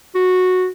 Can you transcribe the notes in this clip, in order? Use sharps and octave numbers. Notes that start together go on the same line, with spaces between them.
F#4